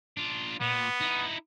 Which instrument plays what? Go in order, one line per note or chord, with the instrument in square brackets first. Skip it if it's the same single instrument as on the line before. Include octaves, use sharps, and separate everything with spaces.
[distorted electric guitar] D4 F4
[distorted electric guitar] A#2 [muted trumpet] B3
[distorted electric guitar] D#4 E4